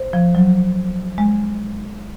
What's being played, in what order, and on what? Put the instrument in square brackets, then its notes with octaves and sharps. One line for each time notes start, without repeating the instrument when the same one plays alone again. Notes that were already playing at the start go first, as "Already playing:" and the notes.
Already playing: [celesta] C5
[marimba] F3
F#3
G#3